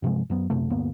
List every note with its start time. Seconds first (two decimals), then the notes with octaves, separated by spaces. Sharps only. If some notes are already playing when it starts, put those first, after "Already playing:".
0.02 G2 C3 F3 G#3
0.30 F#2 F#3 B3
0.50 A#1 F#2 C3 A3
0.70 D2 G2 A#3 B3